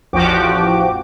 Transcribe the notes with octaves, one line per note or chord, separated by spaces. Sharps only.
A1 E2 F3 F#4 G4 D6